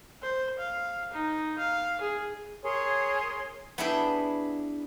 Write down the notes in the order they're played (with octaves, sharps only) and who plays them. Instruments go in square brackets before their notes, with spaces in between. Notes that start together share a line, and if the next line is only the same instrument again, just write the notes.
[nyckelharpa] C5
F5
D#4
F5
G#4
[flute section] G#4 A#4 C#5 C6
[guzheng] B3 D4 E4 G#4 E5 G5